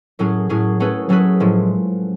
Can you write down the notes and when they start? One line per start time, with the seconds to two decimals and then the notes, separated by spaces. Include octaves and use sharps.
0.19 A2 F#3 C#4 G#4
0.49 A2 F#3 C#4 G#4
0.80 F#3 A3 C#4 G#4 B4
1.09 F#3 A3 C#4 G#4 B4
1.40 A2 F3 G#3